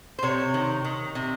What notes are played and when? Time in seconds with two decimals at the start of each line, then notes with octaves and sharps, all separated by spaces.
0.19 C5
0.23 C3 C#5
0.54 D#3
0.84 D#3
1.15 C3